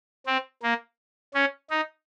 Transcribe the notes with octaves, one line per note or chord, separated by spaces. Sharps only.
C4
A#3
C#4
D#4